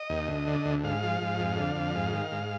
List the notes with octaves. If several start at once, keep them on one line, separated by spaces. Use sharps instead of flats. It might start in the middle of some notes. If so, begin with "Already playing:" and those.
Already playing: D#5
D#2
D2
D3
D2
G#2 F5
F3
G#2
F2
D3
F2
G#2
D#3
G#2